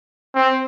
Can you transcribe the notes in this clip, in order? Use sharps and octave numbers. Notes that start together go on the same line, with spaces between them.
C4